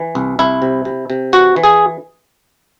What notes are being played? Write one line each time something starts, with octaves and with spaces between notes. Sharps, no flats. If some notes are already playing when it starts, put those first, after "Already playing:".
Already playing: E3
C2
C2 E4
C3
C3
C3
E3 F#4
E3
G#4